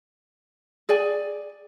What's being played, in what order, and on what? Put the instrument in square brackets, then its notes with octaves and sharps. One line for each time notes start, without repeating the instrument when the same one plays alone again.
[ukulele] G#4 D5 G#5